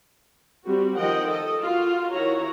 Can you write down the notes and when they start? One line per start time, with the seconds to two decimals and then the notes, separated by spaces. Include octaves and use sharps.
0.65 G3 C4 F#4
0.95 D#3 F3 D#5 F#5 G5
1.27 A4 D#5
1.62 F4 F#4
2.11 D#3 E4 F#4 C#5 A#5